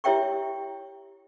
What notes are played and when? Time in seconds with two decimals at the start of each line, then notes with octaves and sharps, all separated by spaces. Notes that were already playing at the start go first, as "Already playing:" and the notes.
0.04 E4 G4 C#5 E5 G5 C#6